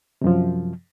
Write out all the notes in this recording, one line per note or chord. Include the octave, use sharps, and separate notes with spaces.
F#2 C3 F3